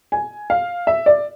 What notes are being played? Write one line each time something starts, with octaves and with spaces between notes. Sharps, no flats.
G#5
F5
E5
D5